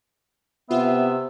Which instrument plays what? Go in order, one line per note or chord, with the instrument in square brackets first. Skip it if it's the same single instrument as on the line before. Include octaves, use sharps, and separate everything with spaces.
[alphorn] C3 [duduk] B3 [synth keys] F4 [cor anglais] E5